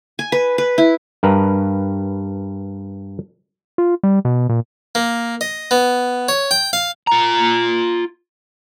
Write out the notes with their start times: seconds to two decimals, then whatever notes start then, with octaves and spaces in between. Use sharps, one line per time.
0.19 G#5
0.32 B4
0.58 B4
0.78 E4
1.23 G2 A#4 B4 A#5
3.78 F4
4.03 G3
4.25 B2
4.49 A#2
4.95 A#3
5.41 D#5
5.71 B3
6.29 C#5
6.51 G5
6.73 F5
7.07 F4 A#5